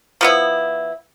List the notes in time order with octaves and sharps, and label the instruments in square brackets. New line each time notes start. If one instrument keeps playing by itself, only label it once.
[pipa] F3 B3 E4